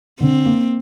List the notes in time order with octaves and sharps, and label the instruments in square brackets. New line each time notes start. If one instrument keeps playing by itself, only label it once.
[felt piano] D3 [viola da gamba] C4
[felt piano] A#3